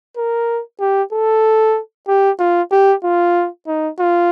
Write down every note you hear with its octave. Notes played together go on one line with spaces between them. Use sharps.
A#4
G4
A4
G4
F4
G4
F4
D#4
F4